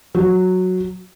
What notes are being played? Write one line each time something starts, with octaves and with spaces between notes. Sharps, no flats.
F#3